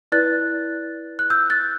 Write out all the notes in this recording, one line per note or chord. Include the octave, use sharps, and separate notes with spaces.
E4 B4 D5 F#6 A6
F#6
E6 G6
F#6 A6